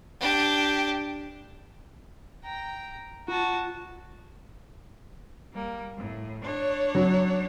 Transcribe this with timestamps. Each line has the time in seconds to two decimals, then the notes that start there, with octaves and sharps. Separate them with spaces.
0.21 D4 G4
2.44 G5 A#5
3.28 F4 F#4 A5
5.52 G3 A#3
5.96 A2
6.42 D4 C#5
6.95 F#3